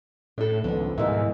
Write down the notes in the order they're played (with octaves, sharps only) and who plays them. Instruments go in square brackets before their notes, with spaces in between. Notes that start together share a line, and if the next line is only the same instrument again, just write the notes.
[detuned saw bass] A2 [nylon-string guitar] D4 A4
[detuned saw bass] C#2 [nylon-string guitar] D3 D4 [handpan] D#3 F3 B3
[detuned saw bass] G#2 [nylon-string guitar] B2 E3 [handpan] G#4 A#4 E5